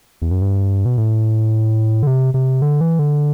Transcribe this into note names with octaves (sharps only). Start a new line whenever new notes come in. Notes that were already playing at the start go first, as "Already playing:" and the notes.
E2
F#2
G2
B2
A2
D3
C3
C3
D3
E3
D3